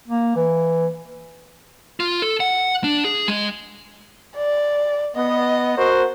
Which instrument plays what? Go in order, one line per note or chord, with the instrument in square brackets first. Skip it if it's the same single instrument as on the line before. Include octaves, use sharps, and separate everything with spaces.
[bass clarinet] A#3
E3
[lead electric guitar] F4
A4
F#5
D4
G#4
G#3
[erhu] D5
[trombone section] B3 [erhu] D#5
[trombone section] F#4 A#4 C5